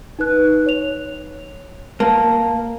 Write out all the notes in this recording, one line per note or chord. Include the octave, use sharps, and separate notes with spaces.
D#4 B4 F#6
C#5 F7
A#3 A5